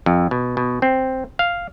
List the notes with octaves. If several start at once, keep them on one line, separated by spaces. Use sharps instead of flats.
F2
B2
B2
C4
F5